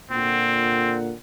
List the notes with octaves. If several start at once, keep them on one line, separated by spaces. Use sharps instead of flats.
A#2 D3 C4 F#5